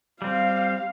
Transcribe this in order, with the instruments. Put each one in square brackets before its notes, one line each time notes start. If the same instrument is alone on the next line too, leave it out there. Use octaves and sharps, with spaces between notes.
[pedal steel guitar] G3 C4 [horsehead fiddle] F5